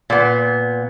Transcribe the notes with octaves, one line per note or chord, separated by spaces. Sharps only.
A#2 B3